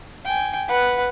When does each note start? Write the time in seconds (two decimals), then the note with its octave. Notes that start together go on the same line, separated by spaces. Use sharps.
0.25 G5 G#5
0.68 B4 F#5